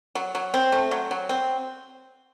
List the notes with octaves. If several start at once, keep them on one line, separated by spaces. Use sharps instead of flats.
F#3
F#3
C4
A3
F#3
F#3
C4